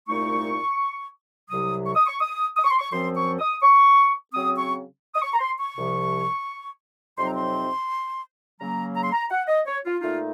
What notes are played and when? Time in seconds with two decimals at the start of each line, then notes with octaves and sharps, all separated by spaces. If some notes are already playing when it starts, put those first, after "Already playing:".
0.08 C2 A#2 A3 D#4 C#6
1.50 C2 C3 F#3 D#6
1.86 C#6
1.95 D#6
2.07 C#6
2.21 D#6
2.56 D#6
2.64 C#6
2.71 C6
2.79 C#6
2.92 F#2 F3 C4 C6
3.16 C#6
3.39 D#6
3.62 C#6
4.33 C#3 F#3 C4 D#6
4.57 C#6
5.15 D#6
5.22 C#6
5.33 A#5
5.40 C6
5.58 C#6
5.76 C2 C3 F3
7.18 F2 C3 F#3 C4 D#4 C6
7.26 A#5
7.35 C6
8.59 C#3 F#3 A#3 A#5
8.95 A#5
9.04 C6
9.12 A#5
9.30 F#5
9.48 D#5
9.66 C#5
9.85 F4
10.01 A#2 A3 D#4 F4